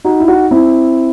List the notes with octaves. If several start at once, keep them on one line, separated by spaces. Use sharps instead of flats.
D#4 F#4
E4
D#4 F#4
C4 E4